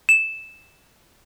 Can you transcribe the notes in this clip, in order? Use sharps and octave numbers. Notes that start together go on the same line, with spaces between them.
E7